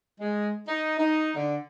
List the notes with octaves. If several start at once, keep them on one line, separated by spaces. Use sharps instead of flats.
G#3
D#4
D#4
D3